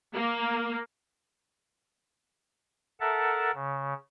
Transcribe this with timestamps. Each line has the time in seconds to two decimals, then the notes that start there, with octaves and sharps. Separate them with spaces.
0.15 A#3
3.00 A4 A#4 E5 F#5 A5
3.55 C#3